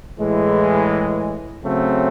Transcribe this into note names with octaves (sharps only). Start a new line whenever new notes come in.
A2 E3 G#3
C#3 F#3 A3 C4